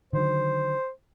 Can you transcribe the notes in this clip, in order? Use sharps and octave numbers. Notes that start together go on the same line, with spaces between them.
D3 D#3 F#3 C5